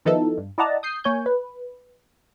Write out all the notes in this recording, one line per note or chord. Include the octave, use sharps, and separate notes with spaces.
D#3 F3 B3 D#4 E4 A4
G2
E4 D5 D#5 F#5 A5 A#5
D#6 G6 C7
A#3 C#5 G#5 G6
B4